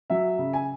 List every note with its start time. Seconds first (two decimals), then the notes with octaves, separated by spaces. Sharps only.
0.10 F#3 E5
0.38 C#3
0.53 G#5